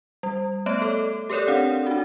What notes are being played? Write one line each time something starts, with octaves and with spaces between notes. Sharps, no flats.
G3
A3 B3 C#5 D#5 D7
A4 D6
G4 A4 A#4 C#5 D5
C4 D4 F5 F#5
D4 F#4